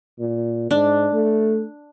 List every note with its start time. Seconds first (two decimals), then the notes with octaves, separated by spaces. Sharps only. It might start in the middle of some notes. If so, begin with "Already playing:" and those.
0.19 A#2
0.71 G#2 D4
1.13 A3